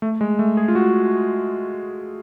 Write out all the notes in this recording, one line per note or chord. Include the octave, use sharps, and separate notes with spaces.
A3
G#3
A3
G#4
F4
F#4